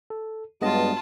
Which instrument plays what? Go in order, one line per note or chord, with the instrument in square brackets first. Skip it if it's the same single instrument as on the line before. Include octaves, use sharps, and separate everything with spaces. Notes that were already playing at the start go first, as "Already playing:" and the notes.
[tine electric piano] A4
[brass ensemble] G2 F#3 [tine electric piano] G#3 B3 D#5 [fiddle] F4 A5